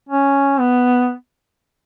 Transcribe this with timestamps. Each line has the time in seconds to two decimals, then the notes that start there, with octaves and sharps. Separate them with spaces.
0.09 C#4
0.59 B3